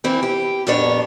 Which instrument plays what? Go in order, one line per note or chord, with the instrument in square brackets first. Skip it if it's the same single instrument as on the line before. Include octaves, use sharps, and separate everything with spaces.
[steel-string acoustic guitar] E3 A#3 C4
G4
F2 A#2 B3 D4 C#5